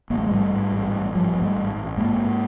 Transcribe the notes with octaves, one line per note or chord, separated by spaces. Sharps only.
A1 A#3
A3
G#3
G#2 G3 A3
G#2
A1
A1
G#2 F3 G3
G#2
G3 A3
A1
A1
G#2 G#3 A#3
G#2